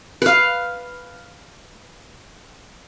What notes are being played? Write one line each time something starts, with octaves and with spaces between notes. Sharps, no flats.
B4 F5